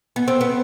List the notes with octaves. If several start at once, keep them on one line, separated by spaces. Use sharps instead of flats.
B3
C4
B3